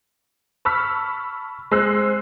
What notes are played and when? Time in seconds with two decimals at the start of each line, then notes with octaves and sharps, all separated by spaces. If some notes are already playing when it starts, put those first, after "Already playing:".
0.65 A5 B5 C#6 E6 F6 B6
1.72 G#3 C4 E6 F#6 C7